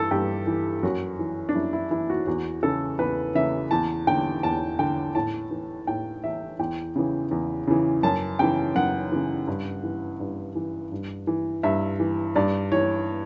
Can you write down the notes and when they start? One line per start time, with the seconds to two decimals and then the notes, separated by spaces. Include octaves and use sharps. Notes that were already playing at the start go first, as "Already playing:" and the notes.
Already playing: G2 E3 A4
0.11 G2 G4
0.47 E3
0.83 F#2 F#4
1.19 E3
1.49 D4
1.55 F#2 E4
1.73 E4
1.91 E3 E4
2.10 F#4
2.27 E2 F#4
2.63 C#3 E3 A4
2.99 E2 B4
3.35 C#3 E3 E5
3.71 E2 A5
4.07 D3 G5
4.43 E2 A5
4.79 D3 G5
5.15 A2 A5
5.51 E3
5.87 A2 G5
6.24 E3 E5
6.59 E2 G5
6.96 C#3 E3
7.31 E2
7.67 C#3 E3
8.03 F#2 A5
8.39 C#3 E3 G5
8.75 F#2 F#5
9.12 C#3 E3
9.47 G2
9.84 E3
10.20 G2
10.55 E3
10.92 G2
11.27 E3
11.63 G2 E5
12.00 E3
12.35 G2 D5
12.72 E3 C#5